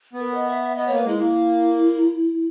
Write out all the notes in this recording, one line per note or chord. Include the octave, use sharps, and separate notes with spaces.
B3
A#4
D#5
E5
E5
B3 D#5
A#3 C#5
B4
G#3 E4
A#3 E4